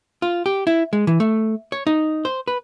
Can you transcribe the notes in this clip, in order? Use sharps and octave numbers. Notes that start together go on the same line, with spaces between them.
F4
G4
E4
G#3
E3
A3
C#5
D#4
C5
B4